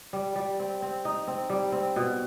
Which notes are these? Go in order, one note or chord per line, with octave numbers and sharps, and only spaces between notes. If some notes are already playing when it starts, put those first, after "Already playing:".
G3
G3
C4
C4
D#4
C4
G3
C4
B2